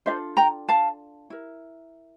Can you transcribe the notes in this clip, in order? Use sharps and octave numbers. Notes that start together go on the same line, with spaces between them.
D4 F4 A4 C5 E5
G5 A#5
F5 A5
E4 A#4